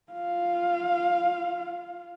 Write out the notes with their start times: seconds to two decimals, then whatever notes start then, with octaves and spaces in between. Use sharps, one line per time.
0.13 F4 F5